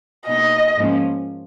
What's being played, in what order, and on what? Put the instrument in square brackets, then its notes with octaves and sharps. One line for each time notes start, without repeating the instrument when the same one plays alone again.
[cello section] B2 A#3 D#4 [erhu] D#5
[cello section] G#2 F3 A#3 C#4